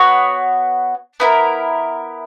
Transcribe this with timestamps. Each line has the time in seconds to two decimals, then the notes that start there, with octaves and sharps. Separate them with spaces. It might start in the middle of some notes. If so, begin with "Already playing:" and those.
Already playing: B3 F#4 C#5
1.20 B3 E4 A#4